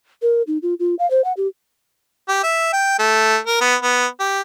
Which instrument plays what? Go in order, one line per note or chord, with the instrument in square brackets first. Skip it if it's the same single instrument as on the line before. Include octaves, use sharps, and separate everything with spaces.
[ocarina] A#4
D#4
F4
F4
F5
C5
F#5
G4
[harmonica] G4
E5
G5
A3
A#4
B3
B3
G4